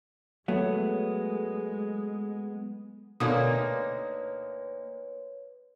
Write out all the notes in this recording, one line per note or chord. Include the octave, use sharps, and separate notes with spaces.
F#3 G#3 A3 B3
D2 B2 D3 A#3 D#4 B4 C#5 D#6